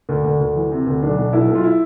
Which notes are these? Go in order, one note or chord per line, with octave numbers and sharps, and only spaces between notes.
D2
D2
D2
E3
C3
D2
B1 D4
B2
B1 E4
B1
F4
E4